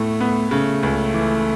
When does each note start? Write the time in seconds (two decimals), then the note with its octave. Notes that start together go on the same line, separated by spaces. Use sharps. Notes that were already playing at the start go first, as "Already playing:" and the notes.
Already playing: A2 A3 B3
0.20 B3
0.51 C#3 A3
0.83 C#2
1.14 E3